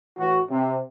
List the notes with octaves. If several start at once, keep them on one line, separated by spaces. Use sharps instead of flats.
A2 E3 F#4
C3